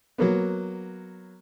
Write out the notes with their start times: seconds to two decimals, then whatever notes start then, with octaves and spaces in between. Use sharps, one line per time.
0.18 F#3 A#3 B3